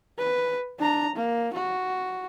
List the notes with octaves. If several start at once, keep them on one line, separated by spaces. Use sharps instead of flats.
B4
D4 A#5
A#3
F#4